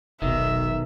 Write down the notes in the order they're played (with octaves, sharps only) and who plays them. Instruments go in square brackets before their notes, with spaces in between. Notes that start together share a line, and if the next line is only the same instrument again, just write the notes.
[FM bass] F1 [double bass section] B1 [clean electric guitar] D#3 [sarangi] E5